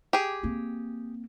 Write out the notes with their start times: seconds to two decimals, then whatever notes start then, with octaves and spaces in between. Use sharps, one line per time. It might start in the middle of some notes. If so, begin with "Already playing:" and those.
0.13 G4 G#4
0.43 A#3 C4